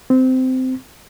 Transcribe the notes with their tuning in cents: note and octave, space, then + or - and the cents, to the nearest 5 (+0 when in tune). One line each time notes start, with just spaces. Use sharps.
C4 -20